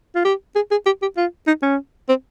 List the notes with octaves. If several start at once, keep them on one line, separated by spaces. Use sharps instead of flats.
F4
G4
G#4
G#4
G4
G4
F4
D#4
C#4
C4